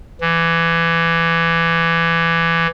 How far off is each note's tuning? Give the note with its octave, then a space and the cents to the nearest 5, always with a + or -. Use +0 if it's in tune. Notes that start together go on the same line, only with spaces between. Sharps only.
E3 +20